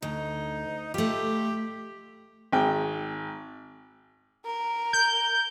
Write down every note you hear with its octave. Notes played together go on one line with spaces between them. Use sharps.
D2 D#4
A3 F4 G4
G#1 G5
A#4
G6